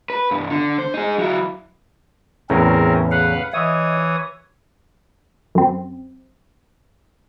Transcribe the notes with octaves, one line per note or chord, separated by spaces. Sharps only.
B4
C2 G2
D3
C5
D#4 G#4
F#3 E4
E2 A2 C#3 C4 C#4 A#4
B4 F5 F#5
E3 C#5 D#5 E5 D#6
F#2 C4